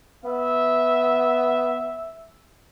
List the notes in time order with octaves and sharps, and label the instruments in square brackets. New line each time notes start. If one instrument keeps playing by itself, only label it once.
[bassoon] B3 [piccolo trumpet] E5